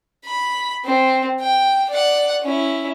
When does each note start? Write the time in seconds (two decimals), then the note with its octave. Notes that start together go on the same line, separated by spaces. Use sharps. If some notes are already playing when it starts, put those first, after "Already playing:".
0.25 B5
0.85 C4
1.41 G5
1.91 D5 F#5
2.42 C#4 E4